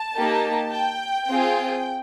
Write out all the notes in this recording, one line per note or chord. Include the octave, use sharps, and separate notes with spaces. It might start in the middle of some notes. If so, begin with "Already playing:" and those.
Already playing: A5
A#3 D#4 G4
G5
C4 F4 G#4